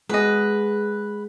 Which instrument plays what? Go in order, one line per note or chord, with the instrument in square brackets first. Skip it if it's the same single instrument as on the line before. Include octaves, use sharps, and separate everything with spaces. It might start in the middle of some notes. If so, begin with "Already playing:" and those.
[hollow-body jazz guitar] G#3 F#4 G#4 [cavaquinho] B4 D#5